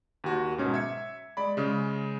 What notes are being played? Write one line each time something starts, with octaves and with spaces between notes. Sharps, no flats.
D#2 F#4
G#2 B2 F#3 C#4
E5 G#6 C#7
G#3 D5 B5
C#3 G#3